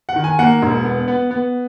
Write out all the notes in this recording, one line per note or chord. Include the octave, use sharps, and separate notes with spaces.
F#5
D#3
G#5
A#3 F#5
E1
B3
B3
B3